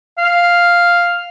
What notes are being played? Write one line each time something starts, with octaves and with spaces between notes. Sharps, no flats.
F5